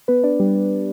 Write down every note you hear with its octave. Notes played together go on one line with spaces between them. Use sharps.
B3 B4
D4 D5
G3 G4